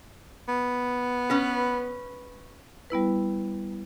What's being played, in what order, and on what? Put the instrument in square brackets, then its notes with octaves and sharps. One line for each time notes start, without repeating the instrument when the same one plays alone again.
[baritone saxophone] B3
[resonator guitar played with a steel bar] C#4 B4
[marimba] G3 B3 E4 B4